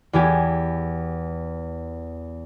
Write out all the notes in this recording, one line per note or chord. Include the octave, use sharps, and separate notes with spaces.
E2 E3 G4 G#5